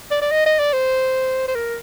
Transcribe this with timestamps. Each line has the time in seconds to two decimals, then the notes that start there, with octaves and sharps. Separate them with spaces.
0.11 D5
0.21 D5
0.31 D#5
0.46 D#5
0.59 D5
0.73 C5
1.48 C5
1.55 A#4